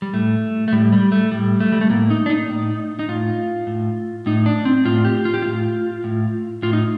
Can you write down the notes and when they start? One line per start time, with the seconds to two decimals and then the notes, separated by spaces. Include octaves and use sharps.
0.02 G3
0.13 A2 A3
0.68 A3
0.72 A2 G3
0.93 G3
1.12 A3
1.31 A2 G3
1.60 A3
1.72 G3
1.81 A3
1.90 A2 A#3
2.10 D#4
2.26 D4
2.30 D#4
2.49 A2
2.99 D#4
3.08 A2 F4
3.67 A2
4.26 A2 D#4
4.46 D4
4.65 C4
4.85 A2 F4
5.05 G4
5.25 F4
5.34 G4
5.42 A2 F4
6.04 A2
6.62 A2 F4
6.73 D#4